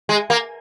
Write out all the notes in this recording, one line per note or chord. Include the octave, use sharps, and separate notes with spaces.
G#3
A#3